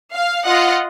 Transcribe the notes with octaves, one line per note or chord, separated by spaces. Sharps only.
F5
F4 D#5 F#5